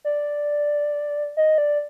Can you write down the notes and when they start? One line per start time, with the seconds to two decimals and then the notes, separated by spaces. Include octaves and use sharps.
0.05 D5
1.37 D#5
1.58 D5